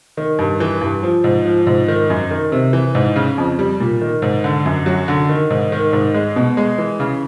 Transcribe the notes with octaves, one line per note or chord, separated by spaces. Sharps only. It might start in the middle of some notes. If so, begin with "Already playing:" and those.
D#3
G2
E3
G2
F3
G#2
F3
G#2
D#3
F#2
D#3
C3
E3
G#2
C#3
F2
G3
A#2
D#3
G#2
D3
F#2
F#3
D3
D#3
G#2
D#3
G#2
G#3
B2
G#3
E3
C#3